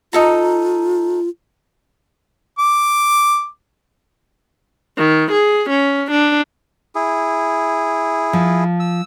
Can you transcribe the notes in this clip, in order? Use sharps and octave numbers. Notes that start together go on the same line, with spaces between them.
D#4 F4 A4 A#5
D6
D#3
G#4
C#4
D4
E4 G#4
F3
E6